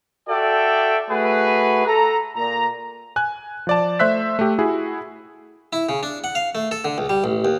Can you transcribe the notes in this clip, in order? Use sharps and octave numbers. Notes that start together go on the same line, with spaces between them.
F#4 A4 D5 E5 G5
A3 F#4 G#4 B4
A4 A#5
A#2 A#5
G#5 F#6
F3 D5 A5
A3 C5 E5 E6 F#6 B6
A3 G4
E4 F#4 G#4
E4
C#3
D4
F#5
F5
A3
A4
D3
C#2
G3
A1
D#2